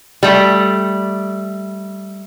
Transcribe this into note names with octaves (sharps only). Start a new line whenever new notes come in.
G3 A3